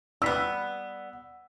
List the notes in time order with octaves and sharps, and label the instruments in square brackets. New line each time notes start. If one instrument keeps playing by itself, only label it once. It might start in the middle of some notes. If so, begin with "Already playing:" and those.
[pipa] G3 B3 [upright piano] E6 B6